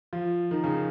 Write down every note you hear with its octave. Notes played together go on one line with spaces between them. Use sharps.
F3 F4
D#3 D#4
C#3 C#4